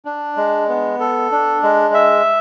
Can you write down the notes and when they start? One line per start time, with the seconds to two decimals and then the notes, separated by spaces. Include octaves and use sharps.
0.05 D4
0.37 G#3
0.69 B3
1.00 A4
1.32 D4
1.63 G#3
1.94 E5